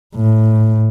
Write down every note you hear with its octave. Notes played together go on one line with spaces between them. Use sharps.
A2